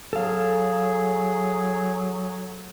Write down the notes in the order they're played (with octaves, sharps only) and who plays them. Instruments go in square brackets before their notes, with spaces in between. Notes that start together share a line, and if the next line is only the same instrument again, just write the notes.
[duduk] F#3 [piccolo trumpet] G#4 [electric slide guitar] A4 F5